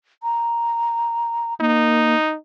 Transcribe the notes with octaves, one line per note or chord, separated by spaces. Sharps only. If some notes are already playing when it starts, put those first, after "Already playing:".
A#5
A#3 D#4